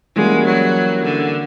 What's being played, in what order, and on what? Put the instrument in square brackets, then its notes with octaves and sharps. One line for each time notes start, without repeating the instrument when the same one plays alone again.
[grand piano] E3 G3 A#3 C#4 F#4 [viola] G#3
[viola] F#3
D3